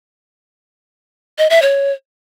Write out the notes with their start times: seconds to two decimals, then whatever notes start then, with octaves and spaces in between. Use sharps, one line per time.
1.38 D#5
1.50 E5
1.62 C#5